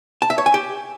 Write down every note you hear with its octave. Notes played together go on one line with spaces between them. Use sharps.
A5
E5
C#5
G#5
G4